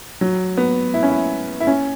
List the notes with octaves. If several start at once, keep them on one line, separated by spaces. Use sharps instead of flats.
F#3
B3
E4
C#4
E4
E4
C#4